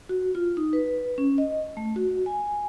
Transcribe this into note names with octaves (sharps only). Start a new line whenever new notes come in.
F#4
F4
D#4
B4
C#4
D#5
A3
F#4
G#5